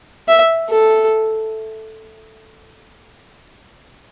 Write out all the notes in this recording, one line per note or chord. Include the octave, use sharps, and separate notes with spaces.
E5
A4